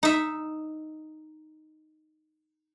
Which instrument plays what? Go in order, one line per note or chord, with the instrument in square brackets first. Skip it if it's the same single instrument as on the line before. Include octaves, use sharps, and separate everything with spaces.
[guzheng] D#4 E5